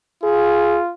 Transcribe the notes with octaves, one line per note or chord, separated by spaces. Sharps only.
F4 G#4